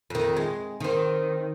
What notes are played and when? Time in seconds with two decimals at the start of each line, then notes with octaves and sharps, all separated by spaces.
0.10 F2 D#3
0.37 G#3
0.80 D#3 C4